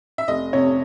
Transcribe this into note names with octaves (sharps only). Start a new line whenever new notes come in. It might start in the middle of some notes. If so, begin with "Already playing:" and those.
E5
F1 D#5
F2 C3 C#5